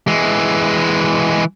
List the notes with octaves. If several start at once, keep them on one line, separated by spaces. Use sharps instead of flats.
E3 G#3